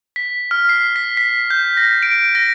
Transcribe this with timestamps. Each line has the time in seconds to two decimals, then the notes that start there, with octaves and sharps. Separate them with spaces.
0.16 B6
0.51 F6
0.69 C7
0.96 B6
1.17 B6
1.50 G6
1.77 A#6
2.03 D7
2.35 A#6